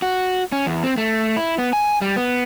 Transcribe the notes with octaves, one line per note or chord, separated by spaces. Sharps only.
F#4
C#4
E2
C4
A3
E4
B3
G#5
G3
B3